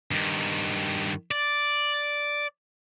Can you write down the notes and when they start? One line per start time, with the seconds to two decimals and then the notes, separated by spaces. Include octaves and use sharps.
0.11 G2 D#3
1.31 D5